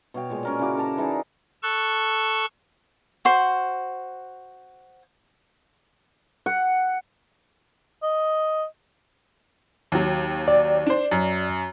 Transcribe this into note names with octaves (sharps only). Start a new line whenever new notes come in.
B2 C#5 F5 G5
A#2 G#3
C#4 A#4 D5
C#3 E4 F#4 D6
A4 A#4 A5 A#5
E3 D#4 G#4 D5
A4 A5 C#6 F#6
F#4 C5
F#5
D#5
D#2 F#3
D5
D4 C5
F#2